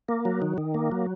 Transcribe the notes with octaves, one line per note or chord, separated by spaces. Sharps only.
A#3
F#3
D#3
D#3
A#3
F#3